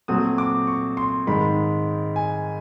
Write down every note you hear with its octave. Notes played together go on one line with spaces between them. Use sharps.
A#2 F#3 A3 C4 D#6
D6
C#6
C6
G#2 D#3 G#3 B5
G#5